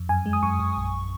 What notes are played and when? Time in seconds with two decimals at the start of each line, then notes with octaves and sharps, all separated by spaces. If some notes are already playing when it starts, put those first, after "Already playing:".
Already playing: F2
0.09 F#2 G#5
0.26 G#3
0.33 D#6
0.43 F#2 C#6
0.60 F#2
0.77 A#1